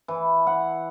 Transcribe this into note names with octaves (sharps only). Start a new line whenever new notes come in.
E3
F#5